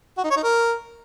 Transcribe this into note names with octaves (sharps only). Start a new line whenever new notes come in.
F#4
D#4
C#5
D#4
A#4